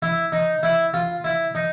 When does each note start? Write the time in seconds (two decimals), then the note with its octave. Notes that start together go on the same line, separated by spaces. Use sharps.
0.02 E4
0.32 D#4
0.63 E4
0.94 F4
1.24 E4
1.55 D#4